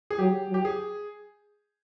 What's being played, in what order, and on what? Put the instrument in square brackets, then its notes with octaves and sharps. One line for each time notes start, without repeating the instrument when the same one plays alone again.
[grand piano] G#4
[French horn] F#3 [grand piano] G4
[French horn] F#3
[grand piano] G4
G#4